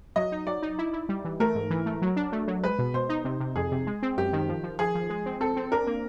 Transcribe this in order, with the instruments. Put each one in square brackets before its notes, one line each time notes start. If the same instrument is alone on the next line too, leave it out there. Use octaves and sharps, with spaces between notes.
[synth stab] F#3 [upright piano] D#5
[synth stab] D#4
[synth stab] F#3 [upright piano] D5
[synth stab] D#4
E4
E4
G3
E3
[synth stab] A3 [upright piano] A#4
[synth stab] G#2
E3
A3
F#3
D4
A3
F#3
[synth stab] G#3 [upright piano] B4
[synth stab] B2
[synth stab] B2 [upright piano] C5
[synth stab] D#4
C3
C3
[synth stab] F2 [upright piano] G#4
[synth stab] C3
G#3
C4
[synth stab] F#2 [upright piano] G4
[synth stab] D#3
F3
F3
[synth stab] F3 [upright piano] G#4
[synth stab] F3
G#3
C4
[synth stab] C4 [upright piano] A4
[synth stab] C4
[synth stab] D4 [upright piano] A#4
[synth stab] A#3